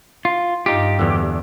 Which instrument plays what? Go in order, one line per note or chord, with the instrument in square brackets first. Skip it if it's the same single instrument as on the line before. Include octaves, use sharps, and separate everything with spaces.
[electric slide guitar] F4
[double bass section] G2 [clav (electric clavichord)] D#4 F4 [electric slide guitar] G4
[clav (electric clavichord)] E2 D3